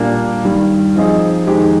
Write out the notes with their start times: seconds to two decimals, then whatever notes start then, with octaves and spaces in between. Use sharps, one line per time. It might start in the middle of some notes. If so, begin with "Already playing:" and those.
Already playing: A#2 G3 A#3 D4
0.45 G2 D#3 G3
0.96 F3 C4 D#4 G#4 D#5
1.47 F2 D#3 G#3 D#4 G4